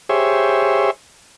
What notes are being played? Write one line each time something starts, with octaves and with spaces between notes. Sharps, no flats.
G4 G#4 C5 C#5 E5